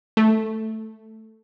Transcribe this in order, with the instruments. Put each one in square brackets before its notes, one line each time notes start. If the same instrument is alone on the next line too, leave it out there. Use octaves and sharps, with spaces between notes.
[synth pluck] A3